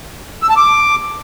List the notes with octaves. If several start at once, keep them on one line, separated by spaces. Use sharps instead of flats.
E6
A5
D6